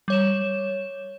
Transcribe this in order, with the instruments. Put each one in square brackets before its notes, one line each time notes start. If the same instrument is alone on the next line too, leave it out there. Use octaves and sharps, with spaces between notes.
[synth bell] G3 C#5 E7